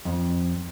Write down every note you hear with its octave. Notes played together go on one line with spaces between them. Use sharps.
F2